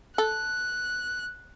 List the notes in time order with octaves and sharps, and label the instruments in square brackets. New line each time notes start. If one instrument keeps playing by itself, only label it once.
[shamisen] A4 [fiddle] F#6